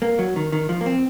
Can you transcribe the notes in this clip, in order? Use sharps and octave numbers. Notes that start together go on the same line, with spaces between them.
A#3
F#3
D#3
D#3
F3
A#3
C4